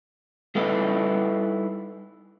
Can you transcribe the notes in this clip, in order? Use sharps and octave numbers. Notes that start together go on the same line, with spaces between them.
G3 D#4 E4 A4 B4 F#5